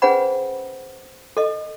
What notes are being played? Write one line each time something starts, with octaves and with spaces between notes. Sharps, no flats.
C#4 G#4 B4 C5 F#5 B5
A4 D#5